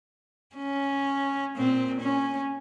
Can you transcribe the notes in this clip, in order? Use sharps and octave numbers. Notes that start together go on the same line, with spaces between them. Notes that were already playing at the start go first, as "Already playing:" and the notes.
C#4
A#2 C4
C#4